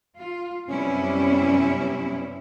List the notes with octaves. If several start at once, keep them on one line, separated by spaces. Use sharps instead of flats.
F4
F#2 C3 G3 B3 C#4 E4